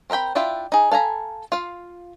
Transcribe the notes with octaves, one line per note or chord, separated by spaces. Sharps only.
C4 A#4 E5 G5 B5
D4 E4 F4 E5 G5
D#4 G#4
A4 F5 G#5 A#5 B5
F4 F5